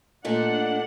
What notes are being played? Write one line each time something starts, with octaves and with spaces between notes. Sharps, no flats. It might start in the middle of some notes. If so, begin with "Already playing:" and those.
A#2 A3 D4 D#4 F#5